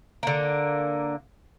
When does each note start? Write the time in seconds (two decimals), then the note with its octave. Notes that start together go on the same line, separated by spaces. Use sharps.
0.23 D3 A#3